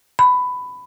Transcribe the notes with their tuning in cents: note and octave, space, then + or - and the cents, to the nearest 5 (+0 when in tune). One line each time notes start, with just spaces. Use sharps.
B5 +15